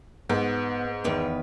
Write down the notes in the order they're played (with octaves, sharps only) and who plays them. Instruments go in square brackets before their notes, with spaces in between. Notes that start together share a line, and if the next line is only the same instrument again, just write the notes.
[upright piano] G#2 [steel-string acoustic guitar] B3
[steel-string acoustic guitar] E2 D#3 B4